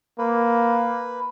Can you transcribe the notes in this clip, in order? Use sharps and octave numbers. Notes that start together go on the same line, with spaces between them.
A#3 B4